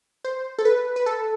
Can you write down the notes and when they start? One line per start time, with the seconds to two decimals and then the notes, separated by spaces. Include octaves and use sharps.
0.24 C5
0.58 A4
0.65 B4
0.96 B4
1.06 A4